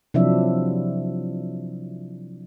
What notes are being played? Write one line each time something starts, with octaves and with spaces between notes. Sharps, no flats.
C3 F3 F#3 D4 E4 E5